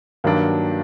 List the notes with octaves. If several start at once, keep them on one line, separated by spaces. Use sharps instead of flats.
G2 D#3 F#3 A#3 D4